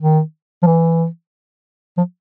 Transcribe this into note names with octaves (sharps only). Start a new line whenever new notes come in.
D#3
F3
E3
F3